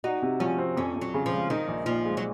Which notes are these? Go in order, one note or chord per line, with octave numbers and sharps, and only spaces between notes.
D#4 F#4
C3
F3 C#4
C4
F2 C#4
F2
F#3
C#3
F3
G#3
D#3 D#4
A#1
A#2 F3
G#3
F#3